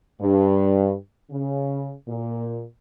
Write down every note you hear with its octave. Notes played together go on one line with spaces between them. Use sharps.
G2
C#3
A#2